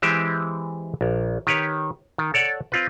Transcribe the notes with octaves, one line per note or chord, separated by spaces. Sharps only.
E3 G#3 C4 G4 E5
A#1
D#3 G4 B4 C#5
D#3
A4 C#5 D5 F#5
C4 F4 B4